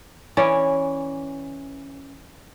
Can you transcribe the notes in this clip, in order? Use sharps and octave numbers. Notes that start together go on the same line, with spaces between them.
E3 C#4 D5